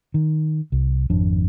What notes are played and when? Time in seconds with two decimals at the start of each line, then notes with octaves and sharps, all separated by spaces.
0.14 D#3
0.72 C2
1.10 G#1 F2 D4